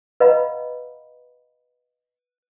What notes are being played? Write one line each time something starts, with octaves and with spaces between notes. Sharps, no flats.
B4 D#5 F5 F#5 A#5 B5